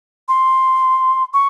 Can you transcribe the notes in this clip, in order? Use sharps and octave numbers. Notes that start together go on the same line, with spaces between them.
C6
C#6